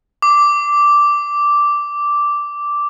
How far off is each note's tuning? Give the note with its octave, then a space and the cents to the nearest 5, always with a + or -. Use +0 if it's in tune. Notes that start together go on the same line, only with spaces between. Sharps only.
D6 -5